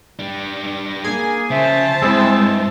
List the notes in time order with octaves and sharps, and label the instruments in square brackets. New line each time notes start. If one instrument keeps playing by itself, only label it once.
[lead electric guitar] G3 D4
[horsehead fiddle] A#3 [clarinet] G#4 [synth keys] G#5
[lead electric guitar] C#3 [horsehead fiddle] C5 A5 [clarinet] E5
[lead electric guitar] G2 [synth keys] G#3 C4 E4 [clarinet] E6